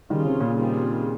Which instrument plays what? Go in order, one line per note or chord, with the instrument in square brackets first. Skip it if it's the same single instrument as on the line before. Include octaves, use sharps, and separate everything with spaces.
[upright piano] D#3 G3 [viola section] C#4 F4 G#4
[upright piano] C3 D#3
A#2 C#3
[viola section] D#3 G3 C4 F4 G#4